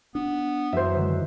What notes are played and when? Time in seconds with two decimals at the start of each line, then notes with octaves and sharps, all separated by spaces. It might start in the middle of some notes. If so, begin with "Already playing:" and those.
0.15 B3 D4
0.73 F#2 E3 F#3 C5 E5
0.96 D3 D#3 G#3